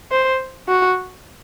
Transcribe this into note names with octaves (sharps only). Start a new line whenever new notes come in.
C5
F#4